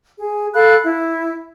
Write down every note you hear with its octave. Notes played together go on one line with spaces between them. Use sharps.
G#4
A4 F5 B5 F#6
E4